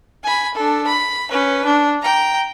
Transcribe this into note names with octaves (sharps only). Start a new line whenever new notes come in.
G#5 B5
D4 A4
B5
C#4 B4
D4
G5 A#5